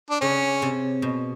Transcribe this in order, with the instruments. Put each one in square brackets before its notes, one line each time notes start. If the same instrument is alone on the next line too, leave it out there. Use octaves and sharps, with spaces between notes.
[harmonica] D4
[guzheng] C#3 [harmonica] C#4
[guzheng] C3
B2